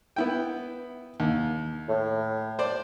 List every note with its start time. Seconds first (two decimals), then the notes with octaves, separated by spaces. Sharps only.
0.16 B3 E4 G5
1.20 D#2
1.88 A2
2.59 C5 D5